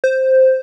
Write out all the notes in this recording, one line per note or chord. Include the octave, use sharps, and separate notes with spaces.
C5